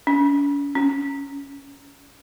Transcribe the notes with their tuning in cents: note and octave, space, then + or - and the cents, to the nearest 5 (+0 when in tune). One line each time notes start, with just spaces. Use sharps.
C#4 +45
C#4 +5